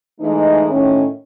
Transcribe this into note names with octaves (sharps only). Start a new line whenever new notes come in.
E3 G#3 A3 D#4
A2 D#3 C#4